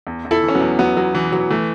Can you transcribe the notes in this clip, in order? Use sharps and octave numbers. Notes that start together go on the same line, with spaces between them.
E2
E2
E4 A4
E3 C#4
F#3 B3
E2
E2 F#3 B3
E2 F#3
E2 E3
E3 F#3
E3 A3